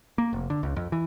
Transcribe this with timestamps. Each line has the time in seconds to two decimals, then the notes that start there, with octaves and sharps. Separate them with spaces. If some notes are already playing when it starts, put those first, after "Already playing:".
0.18 A#3
0.33 F1
0.50 D3
0.63 C#2
0.76 F2
0.92 E3